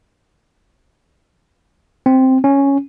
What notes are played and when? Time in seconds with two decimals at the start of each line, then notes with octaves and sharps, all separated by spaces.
2.06 C4
2.44 C#4